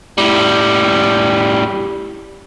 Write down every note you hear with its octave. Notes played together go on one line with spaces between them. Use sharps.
A2 G3